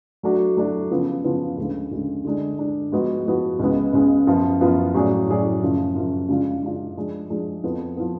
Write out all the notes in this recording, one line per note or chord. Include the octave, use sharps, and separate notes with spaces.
F#3 A3 D4 F#4
F#3 A3 D4 F#4
C#3 F3 B3 F4
C#3 F3 B3 F4
D2 C#3 G#3
D2 C#3 G#3
D3 G#3 D4
D3 G#3 D4
G#2 F3 B3 F#4
G#2 F3 B3 F#4
C#2 C#3 G#3 B3
C#2 C#3 G#3 B3
F#2 F3 B3 F4
F#2 F3 B3 F4
A2 F#3 C#4 G#4 D5
A2 F#3 C#4 G#4 D5
F#2 C#3 F3
F#2 C#3 F3
C#3 G#3 D4 F4
C#3 G#3 D4 F4
F3 G#3 D4 G#4
F3 G#3 D4 G#4
F2 F3 B3
F3 B3